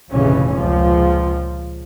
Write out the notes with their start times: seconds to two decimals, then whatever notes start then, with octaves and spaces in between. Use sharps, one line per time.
0.13 F1 A#1 C#3 E3 C#4
0.54 C#2 A#2 F3